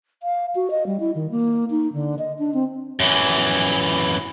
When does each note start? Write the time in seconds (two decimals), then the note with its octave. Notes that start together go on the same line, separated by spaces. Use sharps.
0.23 F5
0.55 F#4
0.71 D#5
0.86 G3
1.00 E4
1.15 D#3
1.31 A#3
1.70 D#4
1.93 D3
2.19 D#5
2.39 D4
2.54 C4
3.00 F#2 E3